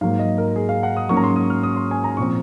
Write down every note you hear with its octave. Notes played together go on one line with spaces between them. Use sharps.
G#2 F#3 A#3 F5
D#5
A#4
G#4
F5
F#5
D#6
G#2 F#3 A#3 C#4 C#6
A#5
C6
D#6
F6
D#6
C6
G#5
A#5
A#2 F3 C4 C#6